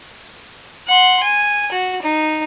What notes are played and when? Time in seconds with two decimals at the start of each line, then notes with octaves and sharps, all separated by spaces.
0.87 F#5 C6
1.23 G#5
1.72 F#4
2.02 D#4